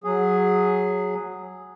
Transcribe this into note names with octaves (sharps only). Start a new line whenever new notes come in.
F#3 G#4